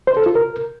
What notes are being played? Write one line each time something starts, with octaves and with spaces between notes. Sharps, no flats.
C5
A4
F4
A#4